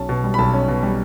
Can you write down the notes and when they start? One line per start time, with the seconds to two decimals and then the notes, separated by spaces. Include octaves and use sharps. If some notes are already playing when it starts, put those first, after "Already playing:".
Already playing: B1 C#4 A5
0.09 B2
0.24 G3
0.34 B5
0.38 B1 A5
0.54 C#4
0.68 B2
0.83 G3